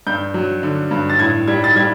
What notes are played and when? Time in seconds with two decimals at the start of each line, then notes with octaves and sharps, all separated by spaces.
0.07 G2 G6
0.34 F#3
0.63 D3
0.91 G2
1.10 A6
1.19 A2 G#6
1.48 G3 G#6
1.64 A6
1.76 G3 G#6